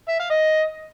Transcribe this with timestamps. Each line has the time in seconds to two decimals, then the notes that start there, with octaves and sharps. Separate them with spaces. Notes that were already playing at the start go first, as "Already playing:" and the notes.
0.09 E5
0.19 F5
0.30 D#5